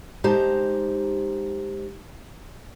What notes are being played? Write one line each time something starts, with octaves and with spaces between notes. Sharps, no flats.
G#3 D#4 G4 C5 A5 A#5